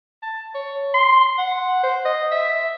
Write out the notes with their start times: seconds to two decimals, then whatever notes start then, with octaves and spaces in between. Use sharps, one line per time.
0.22 A5
0.54 C#5
0.94 C6
1.38 F#5
1.83 C5
2.05 D#5
2.31 E5